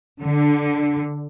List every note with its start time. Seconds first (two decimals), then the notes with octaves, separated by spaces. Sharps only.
0.21 D3